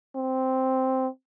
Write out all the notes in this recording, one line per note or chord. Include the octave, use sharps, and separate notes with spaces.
C4